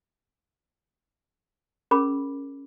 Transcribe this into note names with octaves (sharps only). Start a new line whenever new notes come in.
C#4 G#4 A#4 B5 D6